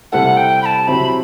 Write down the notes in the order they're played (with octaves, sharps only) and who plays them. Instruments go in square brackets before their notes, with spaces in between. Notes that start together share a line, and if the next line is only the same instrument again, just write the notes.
[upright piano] C3 G3 C4 E4 A4 [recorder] F#5
[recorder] G5
B5
A5
[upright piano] C3 F#3 C4 E4 [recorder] B5